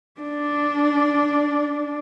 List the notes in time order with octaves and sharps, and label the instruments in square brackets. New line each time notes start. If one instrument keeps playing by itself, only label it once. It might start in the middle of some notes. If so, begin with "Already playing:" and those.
[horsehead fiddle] D4 D5